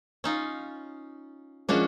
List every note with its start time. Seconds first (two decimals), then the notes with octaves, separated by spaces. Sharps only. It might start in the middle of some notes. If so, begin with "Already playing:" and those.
0.24 C#4 D#4 F4
1.69 F3 G#3 A#3 C#4 D4 F#4 G#4